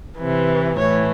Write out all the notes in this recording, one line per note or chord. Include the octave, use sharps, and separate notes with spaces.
C3 E3
A2 E3 C#5